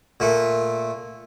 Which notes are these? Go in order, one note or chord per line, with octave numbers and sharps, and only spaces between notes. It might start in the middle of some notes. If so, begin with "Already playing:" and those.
A#2 A3